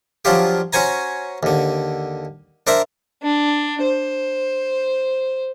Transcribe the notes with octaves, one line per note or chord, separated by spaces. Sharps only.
F3 F#3 D4 F4 G4
C#4 F#4 C5 G#5 A#5
D#2 D3
D4 A#4 C5 E5 A#5
D4
C5